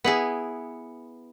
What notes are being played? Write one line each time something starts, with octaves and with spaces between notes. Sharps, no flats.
B3 E4 G#4